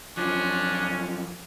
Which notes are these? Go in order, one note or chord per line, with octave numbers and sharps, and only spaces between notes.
F#2 F3 C#4 D4